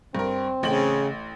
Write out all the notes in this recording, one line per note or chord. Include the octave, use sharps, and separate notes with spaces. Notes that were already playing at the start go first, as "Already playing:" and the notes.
G2 C4 A#4
A1 C#3 G5 F#7